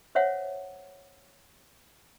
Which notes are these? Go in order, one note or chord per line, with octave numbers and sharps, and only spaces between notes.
C5 C#5 E5 F#5